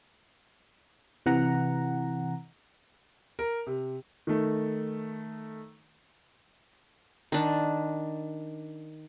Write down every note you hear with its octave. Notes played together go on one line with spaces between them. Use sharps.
C3 E3 F#5 A#5
A#4
C3
D#3 A3
D#3 D4